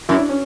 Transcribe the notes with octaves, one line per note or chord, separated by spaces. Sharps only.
F#2 E4
D4
C#4